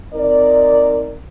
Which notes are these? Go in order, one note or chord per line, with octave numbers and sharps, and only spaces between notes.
C4 D#4 A#4 D5